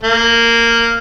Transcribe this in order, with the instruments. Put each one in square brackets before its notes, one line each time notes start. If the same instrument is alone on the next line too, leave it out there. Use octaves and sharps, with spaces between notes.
[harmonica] A#3